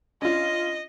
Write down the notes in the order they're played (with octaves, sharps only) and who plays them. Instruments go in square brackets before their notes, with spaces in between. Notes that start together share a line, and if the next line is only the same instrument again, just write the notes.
[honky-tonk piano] C#4 D4 F4 [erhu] D#5